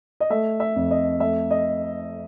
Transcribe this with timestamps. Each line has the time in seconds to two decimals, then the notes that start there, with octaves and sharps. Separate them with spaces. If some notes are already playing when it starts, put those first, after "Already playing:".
0.20 D#5
0.30 A3 E5
0.60 E5
0.76 F2
0.91 D#5
1.20 A3 E5
1.51 D#5